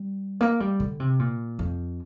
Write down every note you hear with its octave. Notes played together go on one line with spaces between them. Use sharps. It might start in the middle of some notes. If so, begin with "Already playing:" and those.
Already playing: G3
A#3
G3
D3
C3
A#2
F2